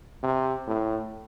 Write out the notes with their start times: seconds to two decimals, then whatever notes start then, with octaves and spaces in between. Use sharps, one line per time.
0.23 C3
0.67 A2